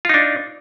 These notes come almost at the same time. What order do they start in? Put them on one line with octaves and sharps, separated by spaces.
F4 D#4 D4